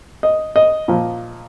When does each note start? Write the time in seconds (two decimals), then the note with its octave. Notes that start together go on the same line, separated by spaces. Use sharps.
0.23 D#5
0.56 D#5
0.88 A#2 F3